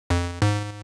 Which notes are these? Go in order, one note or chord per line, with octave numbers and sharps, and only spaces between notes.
F2
G#2